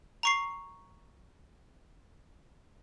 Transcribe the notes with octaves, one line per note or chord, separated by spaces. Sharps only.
A#5 C#6 C7